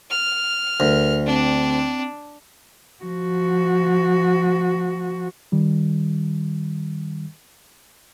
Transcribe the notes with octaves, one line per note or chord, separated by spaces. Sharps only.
F6
D2 A#4
C4 D4
F3 F#4
D#3 G3